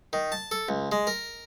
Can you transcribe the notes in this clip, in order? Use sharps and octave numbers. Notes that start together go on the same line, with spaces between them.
D#3
A5
A4
C#2
G#3
A#4